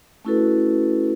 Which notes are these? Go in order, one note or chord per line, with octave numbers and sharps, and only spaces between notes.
A3 C#4 E4 F#4 A4 B4